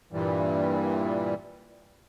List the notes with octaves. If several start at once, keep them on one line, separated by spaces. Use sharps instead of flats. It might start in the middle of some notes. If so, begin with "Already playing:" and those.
G2 A#2 E3 G3